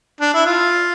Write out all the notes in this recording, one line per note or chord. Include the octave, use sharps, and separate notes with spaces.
D4
E4
F4